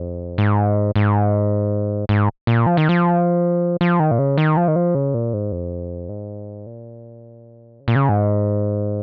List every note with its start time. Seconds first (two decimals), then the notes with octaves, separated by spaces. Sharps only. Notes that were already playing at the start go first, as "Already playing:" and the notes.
Already playing: F2
0.38 G#2
0.96 G#2
2.09 G#2
2.47 A#2
2.66 F3
2.77 D#3
2.89 F3
3.81 F3
4.00 D#3
4.11 A#2
4.19 C#3
4.38 D#3
4.57 F3
4.68 D#3
4.76 F3
4.95 C#3
5.14 A#2
5.34 G#2
5.52 F2
6.09 G#2
6.66 A#2
7.80 C#3
7.88 A#2
7.96 C#3
8.09 G#2